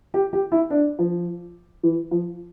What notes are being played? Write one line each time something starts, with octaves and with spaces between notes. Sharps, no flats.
G4
G4
E4
D4
F3
E3
F3